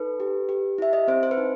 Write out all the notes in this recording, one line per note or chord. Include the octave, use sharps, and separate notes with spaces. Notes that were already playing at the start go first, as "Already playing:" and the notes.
Already playing: D#4 A4 B4
G4
G4
E4 E5
D#5
C4 C5
C5
B4
D#4